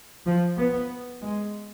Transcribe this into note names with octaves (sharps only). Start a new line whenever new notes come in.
F3
B3
G#3